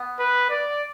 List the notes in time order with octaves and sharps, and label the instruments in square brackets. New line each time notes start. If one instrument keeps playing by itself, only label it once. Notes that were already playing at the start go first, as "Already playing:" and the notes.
Already playing: [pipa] B3
[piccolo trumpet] B4
D5